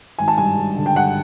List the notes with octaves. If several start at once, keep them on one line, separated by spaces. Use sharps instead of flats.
G#1 G#5
A5
G2 G#5
G2
D3
G5
G2 F#5